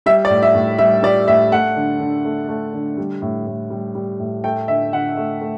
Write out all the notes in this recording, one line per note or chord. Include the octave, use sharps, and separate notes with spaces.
G3 E5
D5
A2
E5
A2
G3 E5
G3 D5
A2 E5
A3 F#5
D3
D3
A3
A3
D3
G3
A2
A2
G3
G3
A2
A3 G5
D3 E5
D3 F#5
A3
A3